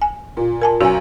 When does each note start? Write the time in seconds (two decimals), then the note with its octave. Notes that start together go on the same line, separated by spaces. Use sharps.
0.02 G#5
0.37 A#2
0.62 A#4 G#5 A5
0.81 B1 F#2 F#4 G#5